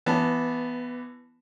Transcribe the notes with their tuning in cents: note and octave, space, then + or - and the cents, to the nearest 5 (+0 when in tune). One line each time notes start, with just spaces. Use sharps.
E3 +20 B3 +0 A5 +0